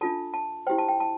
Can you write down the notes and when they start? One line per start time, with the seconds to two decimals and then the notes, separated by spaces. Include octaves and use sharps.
0.01 D4 F4 A4 A5
0.34 A5
0.67 E4 G4 C5 G5
0.78 A5
0.88 G5
1.00 A5